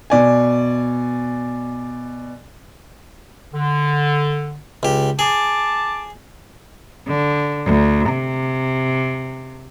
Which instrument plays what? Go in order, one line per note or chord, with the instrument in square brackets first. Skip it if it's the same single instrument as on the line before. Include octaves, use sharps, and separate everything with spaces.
[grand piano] B2 D5 G#5
[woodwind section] D3
[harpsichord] C#2 G4
[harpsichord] G#4 [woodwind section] A5 D6
[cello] D3
D2
C3